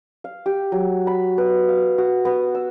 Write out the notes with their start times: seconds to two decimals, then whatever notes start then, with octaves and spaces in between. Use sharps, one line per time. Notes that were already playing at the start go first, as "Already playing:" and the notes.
0.24 F5
0.46 G4
0.72 F#3
1.07 B5
1.38 B4
1.69 F5
1.98 F#4
2.25 B3
2.55 E6